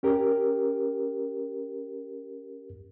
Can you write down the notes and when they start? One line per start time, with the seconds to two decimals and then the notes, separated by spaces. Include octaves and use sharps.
0.03 C#4 G4 A#4